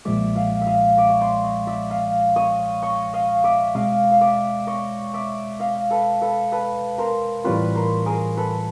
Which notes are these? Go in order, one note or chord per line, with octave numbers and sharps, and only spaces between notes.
B1 A#2 F3 G#3 D5 E5
D#5 F5
E5
D#5 F5
D5 E5
C#5
C5 D5
C#5 D#5
D5 E5
D#5 F5
C#5 D#5
C#5 D#5
D#5 F5
D5 E5
B2 G#3 C4 D#5 F5
F5
D5 E5
C#5 D#5
D5 E5
D#5 F5
A4 B4
A4 B4
A4 B4
A#4 C5
A2 E3 G3 C4 F4 B4 C#5
A#4 C5
G#4 A#4
A4 B4